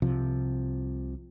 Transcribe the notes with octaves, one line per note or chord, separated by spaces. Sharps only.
C2 C3 F3